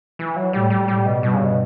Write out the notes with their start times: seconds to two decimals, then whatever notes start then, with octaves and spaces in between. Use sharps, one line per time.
0.19 E3
0.36 F#3
0.53 A2 G3
0.70 G3
0.88 A2 G3
1.06 B2
1.22 G2 B2
1.33 C#3
1.44 B2